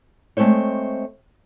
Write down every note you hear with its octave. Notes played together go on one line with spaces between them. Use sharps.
G#3 A3 C4 C5 C#5